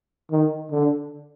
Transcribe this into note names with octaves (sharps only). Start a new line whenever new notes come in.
D#3
D3